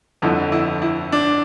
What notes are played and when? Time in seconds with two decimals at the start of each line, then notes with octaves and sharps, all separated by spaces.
0.22 G1 F2 D3 E4
0.52 E4
0.82 E4
1.12 D4